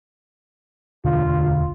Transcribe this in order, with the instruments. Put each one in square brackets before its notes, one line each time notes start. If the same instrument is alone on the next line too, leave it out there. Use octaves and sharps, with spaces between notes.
[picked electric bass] E1 D2 D3 [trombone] F4